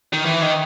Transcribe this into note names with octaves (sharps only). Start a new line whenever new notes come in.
D#3
E3
D#3